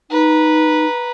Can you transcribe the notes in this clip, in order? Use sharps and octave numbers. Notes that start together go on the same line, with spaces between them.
D#4 B4 A#5